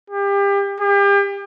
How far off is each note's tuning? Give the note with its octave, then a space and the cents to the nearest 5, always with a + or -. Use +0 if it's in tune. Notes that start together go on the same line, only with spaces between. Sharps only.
G4 +30
G4 +35